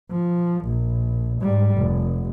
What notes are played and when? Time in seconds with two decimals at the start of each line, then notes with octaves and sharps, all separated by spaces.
0.11 F3
0.65 A#1
1.41 G#2 G3
1.78 F1